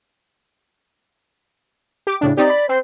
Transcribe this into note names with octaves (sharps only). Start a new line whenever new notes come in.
G4 D6
A2 C#3 D4
C4 D#4 G4 D5
B5
C4 C5